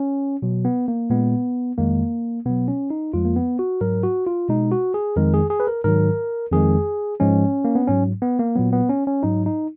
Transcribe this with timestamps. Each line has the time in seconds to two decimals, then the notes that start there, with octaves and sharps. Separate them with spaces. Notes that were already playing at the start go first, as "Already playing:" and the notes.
Already playing: C#4
0.42 B2 F#3
0.65 B3
0.88 A#3
1.10 A#2 G#3 B3
1.78 F2 D#3 G#3 A#3
2.46 B2 F#3 B3
2.68 C#4
2.90 D#4
3.13 F2 F3 G#3 F4
3.25 A#3
3.36 B3
3.59 F#4
3.81 G#2 F#3 A#4
4.03 F#4
4.27 F4
4.49 B2 G#3 D#4
4.72 F#4
4.94 G#4
5.16 F2 D#3 G#3 A#4
5.34 G#4
5.50 G#4
5.60 B4
5.67 A#4
5.84 G#2 D#3 F#3 A#4
6.52 F2 D#3 G#3 G#4
7.20 G#2 F3 G#3 C#4
7.65 A#3
7.75 B3
7.87 G#2 F#3 C#4
8.22 B3
8.39 A#3
8.56 A#2 F#3 B3
8.73 B3
8.89 C#4
9.07 C#4
9.23 G#2 F#3 D#4
9.46 D#4